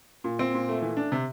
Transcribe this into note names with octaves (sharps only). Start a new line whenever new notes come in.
A#2
C4
A#2
A3
E3
D4
C3